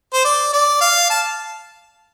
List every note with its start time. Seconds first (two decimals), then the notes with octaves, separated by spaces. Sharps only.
0.13 C5
0.25 D5
0.53 D5
0.81 F5
1.10 A5